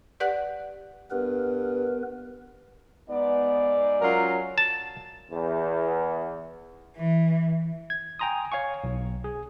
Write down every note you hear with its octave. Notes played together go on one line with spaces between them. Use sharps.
G4 B4 D5 F#5 F#6
G2 B3 A#4 B4
G#2 B3 D5
F#3 C#4 F4 A#4
A5
E2
E3
G#6
G5 G#5 A#5 C6 D#6
C#5 F5 G#5 C#6
B1
G#4